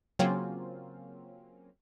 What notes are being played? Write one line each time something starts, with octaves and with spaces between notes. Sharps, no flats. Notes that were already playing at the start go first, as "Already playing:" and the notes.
C#3 F#3 A#3 C4 C#4 F4